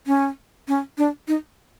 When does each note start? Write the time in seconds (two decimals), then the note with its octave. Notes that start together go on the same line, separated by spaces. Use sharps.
0.07 C#4
0.68 C#4
0.98 D4
1.28 D#4